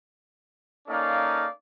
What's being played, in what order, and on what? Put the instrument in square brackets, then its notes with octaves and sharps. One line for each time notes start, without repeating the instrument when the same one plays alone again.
[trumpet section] A#3 C#4 D#4 A4 D5 F5